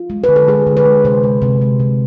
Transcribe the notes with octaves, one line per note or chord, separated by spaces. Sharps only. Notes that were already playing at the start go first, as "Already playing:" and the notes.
Already playing: F4
G#3
D3 B4
A4
G#3 G#4
D3
B4
G#3
C3 C5
G#3
C3
G#3
C3